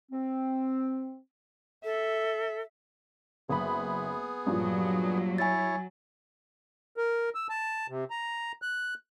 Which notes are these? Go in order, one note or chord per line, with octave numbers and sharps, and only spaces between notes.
C4
A4 E5
F#1 B3 G#4 B5
G2 A#2 F3 F#3
E4 C#5 G#5 A6
A#4
E6
A5
C3
A#5
F#6